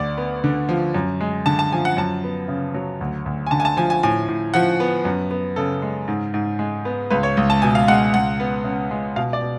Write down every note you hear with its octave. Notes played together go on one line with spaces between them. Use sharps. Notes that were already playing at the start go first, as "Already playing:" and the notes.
Already playing: D2 D5
B3
D3
F3
F#2
G#3
D3 A5
A5
F3 G#5
F#5
F#2 A5
B3
C#3
F#3
D2
D2
G#5
D3 A5
G#5
A5
F3 G#5
G#5
A2 G#5
A2
F3 F#5
B3
F#2
B3
C#3 A4
G#3
G#2
G#2
G#3
B3
C#2 B4
C#5
C#2
A5
B2 G#5
F5
G#3 F#5
C#2 F#5
B3
C#3
G#3
B2 F5
D5
B2